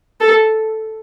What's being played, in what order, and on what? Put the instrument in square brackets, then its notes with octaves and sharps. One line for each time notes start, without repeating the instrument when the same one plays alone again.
[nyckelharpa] A4